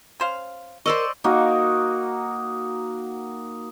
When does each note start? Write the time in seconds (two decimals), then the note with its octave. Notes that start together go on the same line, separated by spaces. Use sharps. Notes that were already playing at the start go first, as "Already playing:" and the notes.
0.20 C#4 C5 F5
0.86 A#4 C5 D5 D#5 C#6 E6
1.24 A#3 D#4 F#4 A#4